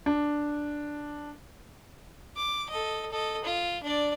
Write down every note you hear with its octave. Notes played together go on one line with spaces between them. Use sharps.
D4
D6
A4 D#5
A4 D#5
F4
D4 D5